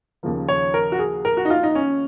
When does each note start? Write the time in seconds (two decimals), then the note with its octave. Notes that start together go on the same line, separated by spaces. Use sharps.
0.23 D#2 C#3 F3 A#3
0.48 C#5
0.74 A#4
0.92 F#4
0.99 G#4
1.25 A#4
1.37 F#4
1.45 D#4
1.50 F4
1.63 D#4
1.75 C#4